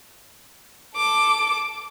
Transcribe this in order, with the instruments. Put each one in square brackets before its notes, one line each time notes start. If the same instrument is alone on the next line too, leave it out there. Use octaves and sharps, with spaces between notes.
[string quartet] A4 D6